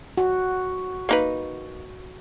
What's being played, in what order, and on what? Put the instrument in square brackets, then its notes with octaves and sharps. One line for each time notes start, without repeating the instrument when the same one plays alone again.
[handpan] F#4
[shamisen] A#3 D#4 B4